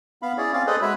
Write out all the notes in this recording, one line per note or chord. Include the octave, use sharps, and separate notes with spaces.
B3 F5 B5
C#4 E4 G#4 C#5 D5
C4 C#4 D5 F5
G#4 A4 B4 C5 D5 D#5
G#3 F#4 B4 C#5 E5 B5